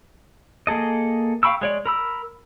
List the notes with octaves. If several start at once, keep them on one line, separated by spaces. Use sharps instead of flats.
A#3 G#4 A4 D#5
F5 G5 B5 C#6 E6
G#3 C#5 D5
A#4 B5 E6